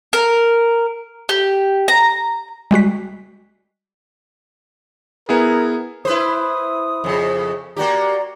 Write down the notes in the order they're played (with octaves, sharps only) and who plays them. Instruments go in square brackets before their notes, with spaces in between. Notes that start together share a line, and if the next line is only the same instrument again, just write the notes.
[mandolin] A#4
G4
A#5
[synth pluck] G3 G#3 F#4 B6
[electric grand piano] B3 E4 G#4 [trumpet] A#4
[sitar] E4 B4 C5 [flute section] D#6
[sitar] F2 C#3
[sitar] A#3 F#4 G4 [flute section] D5 A#5